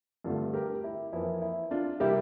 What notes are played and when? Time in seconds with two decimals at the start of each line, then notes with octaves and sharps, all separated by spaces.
0.24 G2 D3 A3 F4 A4
0.54 G4 A#4
0.84 E4
1.13 F2 E3 A#3 E4
1.42 E4
1.71 D4 F4
2.00 C3 G3 A#3 E4 G4